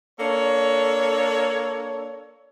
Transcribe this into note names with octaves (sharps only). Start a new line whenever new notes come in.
A#3 D4 A4 C#5